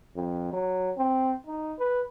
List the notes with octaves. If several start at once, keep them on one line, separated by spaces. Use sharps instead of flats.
F2
F#3
C4
D#4
B4